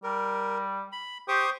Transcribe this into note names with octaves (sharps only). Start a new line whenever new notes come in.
G3 A#4
B5
G4 C5 C#6 D#6